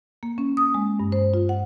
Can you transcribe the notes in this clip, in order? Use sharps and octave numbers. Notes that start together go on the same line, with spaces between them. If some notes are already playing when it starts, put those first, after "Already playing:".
A#3
C#4
D#6
G#3
G2
C5
F4
F#5